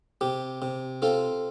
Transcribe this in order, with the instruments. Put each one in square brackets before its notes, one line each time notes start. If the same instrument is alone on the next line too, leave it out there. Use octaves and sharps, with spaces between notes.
[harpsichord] C3 G4
C3
C4 F4 A4